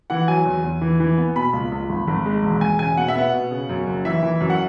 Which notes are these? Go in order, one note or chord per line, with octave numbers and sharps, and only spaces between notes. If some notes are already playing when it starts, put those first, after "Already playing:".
E3 F#5
F#3 G#5
E2
E2
E3
E3
B3
B2 B5
C#2
C#2
G#1
G#1
G#3
E1
E1 G#5
C#3 G#5
B2 F#5
E5
B3 F#5
B2
C#3
F#2
F#1
E3 E5
E3
F#2
F#5